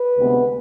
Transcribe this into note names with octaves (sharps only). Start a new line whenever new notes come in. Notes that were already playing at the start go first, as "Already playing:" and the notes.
Already playing: B4
D2 C3 G#3 B3